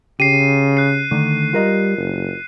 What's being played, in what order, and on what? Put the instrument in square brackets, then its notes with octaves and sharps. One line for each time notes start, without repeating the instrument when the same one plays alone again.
[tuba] C#3 [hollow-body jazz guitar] G4 [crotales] C7 D#7
[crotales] F#6 C7
[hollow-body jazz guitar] D3 D#3 A3
[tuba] G3 [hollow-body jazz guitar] F4 A#4 D#5
[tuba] F#1